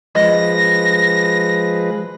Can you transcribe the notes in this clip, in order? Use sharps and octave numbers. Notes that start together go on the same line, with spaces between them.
F3 G#3 B4 D#5 A#6